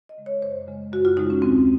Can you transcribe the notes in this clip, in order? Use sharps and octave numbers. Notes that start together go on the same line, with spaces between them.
D#5
C#3 G#3
C#5
F#2 C5
C#3 G#3
F#2 F#4
F4
C#3 G#3 D#4
C#4
D#2 C4